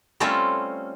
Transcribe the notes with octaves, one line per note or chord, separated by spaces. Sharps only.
G3 A3 C4 C#4 F4 A4